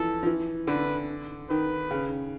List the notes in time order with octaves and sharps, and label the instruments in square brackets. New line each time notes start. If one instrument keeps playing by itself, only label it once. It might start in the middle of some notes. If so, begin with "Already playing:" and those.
Already playing: [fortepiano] E3 F3 [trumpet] A4
[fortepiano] F3
E3
[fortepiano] D3 [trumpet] B4
[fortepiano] D#3 [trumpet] B4
[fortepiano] C#3